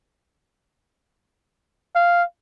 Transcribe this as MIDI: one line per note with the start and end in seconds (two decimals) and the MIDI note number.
1.96 2.24 77